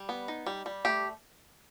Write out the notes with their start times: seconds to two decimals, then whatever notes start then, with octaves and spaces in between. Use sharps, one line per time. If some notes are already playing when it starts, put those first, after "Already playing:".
Already playing: G3
0.09 B3
0.28 D#4
0.46 G3
0.66 G3
0.85 A3 G4